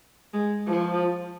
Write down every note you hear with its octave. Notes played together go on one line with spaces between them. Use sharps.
G#3
F3